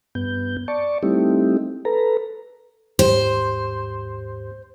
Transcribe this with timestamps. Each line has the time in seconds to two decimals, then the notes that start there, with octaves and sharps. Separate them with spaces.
0.15 G2 B3 G6
0.68 D5 A5 C#6
1.03 G3 A3 C4 D#4 E4 G4
1.85 A4 B4 A#5
2.99 D#2 G#2 G4 C5